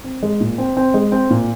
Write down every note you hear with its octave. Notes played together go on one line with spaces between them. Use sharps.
C4
G#3
A#2
C4
C4
G#3
C4
A#2